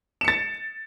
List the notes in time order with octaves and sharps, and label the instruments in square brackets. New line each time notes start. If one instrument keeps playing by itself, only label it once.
[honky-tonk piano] E7
C#7
A6